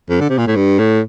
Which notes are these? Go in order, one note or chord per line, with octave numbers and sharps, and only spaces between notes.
F2
D3
C3
A#2
A2
G2
A2